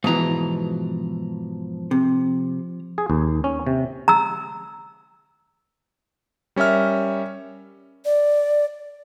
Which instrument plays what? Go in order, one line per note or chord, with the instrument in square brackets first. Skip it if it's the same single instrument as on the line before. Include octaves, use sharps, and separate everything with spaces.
[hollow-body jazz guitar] G#2 B2 E3 [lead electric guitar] F3 A#5
[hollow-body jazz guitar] C3
[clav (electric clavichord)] G#4
D#2
C#4
C3
[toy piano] A#5 E6
[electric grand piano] G3 C#4 A#4 E5 F6
[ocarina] D5